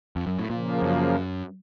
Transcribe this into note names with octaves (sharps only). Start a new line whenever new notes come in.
F2
F#2
A2
A#2 C#3 F3 A#3
F#2